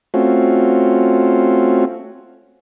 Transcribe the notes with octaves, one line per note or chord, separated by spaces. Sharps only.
A3 C4 C#4 F4 F#4